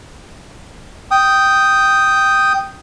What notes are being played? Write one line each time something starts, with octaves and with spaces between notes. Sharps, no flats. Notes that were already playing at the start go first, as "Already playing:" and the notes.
G5 D#6